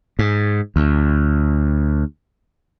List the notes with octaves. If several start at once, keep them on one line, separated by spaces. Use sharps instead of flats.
G#2
D2